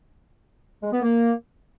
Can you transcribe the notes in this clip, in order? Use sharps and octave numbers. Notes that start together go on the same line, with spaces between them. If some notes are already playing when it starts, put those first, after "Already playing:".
G#3
B3
A#3